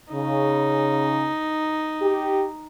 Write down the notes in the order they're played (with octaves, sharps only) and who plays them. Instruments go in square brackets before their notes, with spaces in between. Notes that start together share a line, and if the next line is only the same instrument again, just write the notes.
[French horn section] C#3 [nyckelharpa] D#4
[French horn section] G4